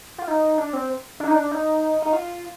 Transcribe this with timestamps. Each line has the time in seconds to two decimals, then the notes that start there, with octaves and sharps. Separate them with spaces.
0.18 F4
0.28 D#4
0.58 D4
0.73 C4
1.20 D4
1.27 D#4
1.35 D4
1.51 D#4
2.02 D#4
2.13 F4